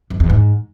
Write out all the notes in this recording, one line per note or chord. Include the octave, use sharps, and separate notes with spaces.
F2
E2
G#2